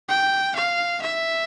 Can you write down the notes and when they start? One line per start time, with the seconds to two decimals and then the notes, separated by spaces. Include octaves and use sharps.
0.09 G5
0.56 F5
1.02 E5